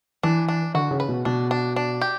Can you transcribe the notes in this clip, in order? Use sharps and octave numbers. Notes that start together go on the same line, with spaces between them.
E3 D4
D4
D3 F#4
C#3
B4
B2
B2 D4
D4
D4
G4